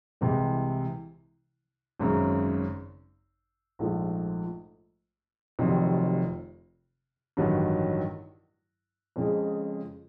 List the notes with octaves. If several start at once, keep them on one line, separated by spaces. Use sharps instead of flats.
C2 C3 E3 G#3
G#1 F#2 C#3
A#1 G#2 F3 A3
F1 F2 C3 D#3 F#3
A1 G2 D#3 F#3
F2 C#3 F3 G#3